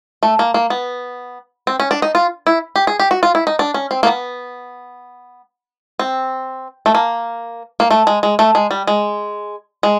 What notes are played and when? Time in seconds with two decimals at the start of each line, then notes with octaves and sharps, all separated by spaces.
0.23 A3
0.39 A#3
0.54 A#3
0.70 B3
1.67 C4
1.80 C#4
1.91 D4
2.02 D#4
2.15 F4
2.47 E4
2.76 G4
2.87 G#4
3.00 G4
3.11 F#4
3.23 F4
3.35 E4
3.47 D#4
3.59 D4
3.74 C#4
3.91 C4
4.03 A#3
4.07 B3
5.99 C4
6.86 A3
6.95 A#3
7.80 A#3
7.91 A3
8.07 G#3
8.23 G#3
8.39 A3
8.55 G#3
8.71 G3
8.87 G#3
9.83 G#3